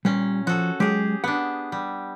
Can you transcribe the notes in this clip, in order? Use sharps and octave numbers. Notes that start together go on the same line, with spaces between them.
A#2 G3 C#4
F3 F#4 A4
F#3 G#3 G4 G#4
B3 D4 F#5
G3